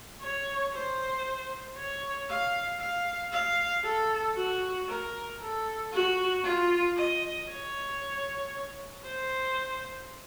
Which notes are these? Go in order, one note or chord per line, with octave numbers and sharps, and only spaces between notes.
C#5
C5
C#5
F5
F5
F5
A4
F#4
A#4
A4
F#4
F4
D#5
C#5
C5